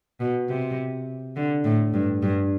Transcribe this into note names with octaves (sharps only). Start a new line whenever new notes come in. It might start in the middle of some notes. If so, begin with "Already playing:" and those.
B2
C3
D3
A2
G2
G2